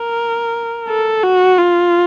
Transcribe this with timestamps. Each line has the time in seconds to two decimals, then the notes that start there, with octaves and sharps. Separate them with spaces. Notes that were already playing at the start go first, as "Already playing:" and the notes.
Already playing: A#4
0.89 A4
1.24 F#4
1.58 F4